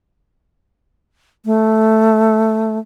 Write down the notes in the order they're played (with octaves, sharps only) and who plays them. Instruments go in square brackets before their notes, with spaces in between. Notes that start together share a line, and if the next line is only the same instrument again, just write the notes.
[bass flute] A3